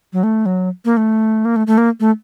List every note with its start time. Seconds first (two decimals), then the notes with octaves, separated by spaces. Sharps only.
0.13 F#3
0.23 A3
0.46 F#3
0.85 A#3
0.97 A3
1.45 A#3
1.56 A3
1.67 A3
1.78 A#3
2.00 A3